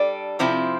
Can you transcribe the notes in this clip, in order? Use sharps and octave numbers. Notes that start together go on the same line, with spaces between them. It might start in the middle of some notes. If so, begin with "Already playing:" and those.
Already playing: G3 D4 A4
C3 F3 C4 E4